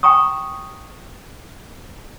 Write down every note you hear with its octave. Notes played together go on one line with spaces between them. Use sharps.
G5 G#5 A#5 C#6 D#6